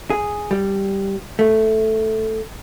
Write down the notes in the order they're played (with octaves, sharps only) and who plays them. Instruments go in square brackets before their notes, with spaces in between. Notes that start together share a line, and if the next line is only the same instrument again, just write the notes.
[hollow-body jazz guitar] G#4
G3
A3